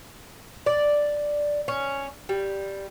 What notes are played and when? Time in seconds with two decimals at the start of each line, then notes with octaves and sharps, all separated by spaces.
0.66 D5
1.68 C#4
2.29 G3